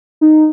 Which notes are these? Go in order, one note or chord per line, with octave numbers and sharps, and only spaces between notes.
D#4